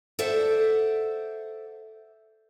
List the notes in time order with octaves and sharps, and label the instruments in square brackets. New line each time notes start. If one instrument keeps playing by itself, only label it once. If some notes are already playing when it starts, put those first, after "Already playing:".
[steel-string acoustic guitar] A4 C5 D5 E5 F#5